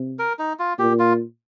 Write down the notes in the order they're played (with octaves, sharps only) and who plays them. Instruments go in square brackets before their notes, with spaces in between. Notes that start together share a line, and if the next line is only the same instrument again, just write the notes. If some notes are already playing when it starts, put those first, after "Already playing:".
Already playing: [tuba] C3
[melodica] A#4
D#4
F4
[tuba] A#2 [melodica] G4
[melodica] F4